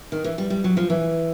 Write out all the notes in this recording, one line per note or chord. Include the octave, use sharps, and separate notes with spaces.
D#3
E3
G3
G3
F#3
F3
E3